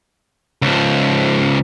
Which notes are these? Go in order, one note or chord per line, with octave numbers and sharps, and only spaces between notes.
C#2 F3